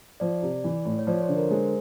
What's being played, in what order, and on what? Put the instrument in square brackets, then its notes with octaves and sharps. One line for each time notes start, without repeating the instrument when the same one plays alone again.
[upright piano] F3 [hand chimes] D5
[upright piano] C3
E3
A2
[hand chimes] C#5
[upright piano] F3 [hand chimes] D5
[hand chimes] C#5
C5
[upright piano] D3
[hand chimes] A#4
[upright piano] G#3 [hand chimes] C5